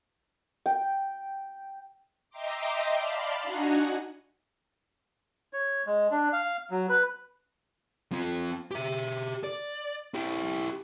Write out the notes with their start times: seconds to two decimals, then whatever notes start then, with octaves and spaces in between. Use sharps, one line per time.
0.66 G5
2.30 D#5 E5 G5 A#5 C6 D6
2.92 D5 F5 A5 B5 C6
3.42 D4 D#4 F#4 F#5 G#5 A#5
5.53 C#5
5.87 G#3
6.11 D4
6.33 F5
6.71 F#3
6.89 B4
8.12 C4 F4
8.71 G4 E5
9.44 D5
10.14 E4 G4